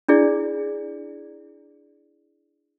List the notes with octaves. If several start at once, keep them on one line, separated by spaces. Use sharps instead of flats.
D4 E4 G#4 D5